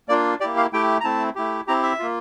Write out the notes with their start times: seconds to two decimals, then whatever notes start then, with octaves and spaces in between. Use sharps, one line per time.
0.09 A#3 D4 F4 D5
0.40 G4 D5
0.43 A#3 E4
0.57 F5
0.73 A3 E4 G4 G5
1.01 A#5
1.04 A3 C4 E4 A5
1.35 A3 E4 G4
1.67 C4 E4 G4 A#5
1.83 E5
1.99 A#3 F4